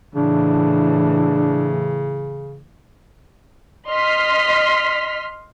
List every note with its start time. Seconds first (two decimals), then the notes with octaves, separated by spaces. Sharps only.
0.15 A2 C#3 E3 D4
3.88 D#5 C6 F6 B6